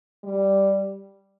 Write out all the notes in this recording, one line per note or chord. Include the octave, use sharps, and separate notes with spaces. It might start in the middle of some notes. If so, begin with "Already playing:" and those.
G3